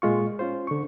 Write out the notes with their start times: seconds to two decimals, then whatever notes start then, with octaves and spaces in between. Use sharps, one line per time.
0.02 A#2 G#3 F4 C#6
0.39 C#4 F4 C5
0.67 D3 C#6